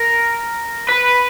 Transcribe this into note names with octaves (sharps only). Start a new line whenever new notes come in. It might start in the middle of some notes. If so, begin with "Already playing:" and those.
Already playing: A#4
B4